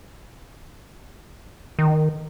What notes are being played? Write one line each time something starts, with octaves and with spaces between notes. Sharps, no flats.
D#3